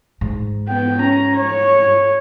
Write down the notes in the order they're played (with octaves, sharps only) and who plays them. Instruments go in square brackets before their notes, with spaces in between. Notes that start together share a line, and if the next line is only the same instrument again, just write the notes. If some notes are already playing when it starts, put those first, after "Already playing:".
[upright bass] G#2
[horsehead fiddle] B3 G5
C#4 A#5
C#5